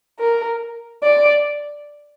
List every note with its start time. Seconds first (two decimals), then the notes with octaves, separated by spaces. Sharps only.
0.20 A#4
1.04 D5